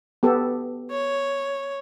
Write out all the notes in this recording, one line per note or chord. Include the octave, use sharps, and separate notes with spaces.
B3 G4 A4
C#5